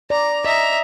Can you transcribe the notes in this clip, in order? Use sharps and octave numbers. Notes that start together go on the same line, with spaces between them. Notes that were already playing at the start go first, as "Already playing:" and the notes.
D5 A#5
D#5 E5 A#5